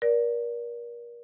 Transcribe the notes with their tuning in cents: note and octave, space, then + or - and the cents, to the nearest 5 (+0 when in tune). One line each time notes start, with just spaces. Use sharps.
A#4 +30 D5 -10